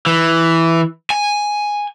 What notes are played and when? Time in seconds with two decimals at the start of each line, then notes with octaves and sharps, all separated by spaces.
0.06 E3
1.10 G#5